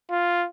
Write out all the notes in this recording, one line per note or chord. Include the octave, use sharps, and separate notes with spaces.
F4